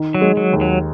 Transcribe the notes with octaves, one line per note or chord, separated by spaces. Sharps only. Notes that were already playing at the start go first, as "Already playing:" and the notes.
Already playing: D#3
F#3
G#3
F#3
D#2
F#3